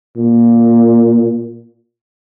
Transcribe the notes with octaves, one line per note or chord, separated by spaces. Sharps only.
A#2